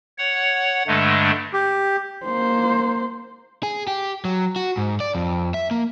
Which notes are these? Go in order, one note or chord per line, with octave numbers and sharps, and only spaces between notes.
C#5 F#5
G2 D3 G#3 A3 D4
G4
A#3 C5
G#4
G4
F#3
F#4
G#2
D5
F2
E5
A#3